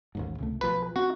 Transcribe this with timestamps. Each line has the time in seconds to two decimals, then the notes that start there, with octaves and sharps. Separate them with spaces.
0.15 A1 D#2 G#2
0.38 C#2 C3 A3
0.61 B1 F3 B4
0.96 C4 F#4